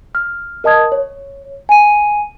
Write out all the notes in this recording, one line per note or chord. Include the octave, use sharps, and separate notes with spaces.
F6
A#4 D#5 A5 D#6 G#6
C#5
G#5 D#7